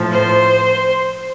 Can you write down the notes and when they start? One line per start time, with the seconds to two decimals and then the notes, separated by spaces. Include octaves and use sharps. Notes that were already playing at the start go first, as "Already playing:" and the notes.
Already playing: A2 F3
0.11 C5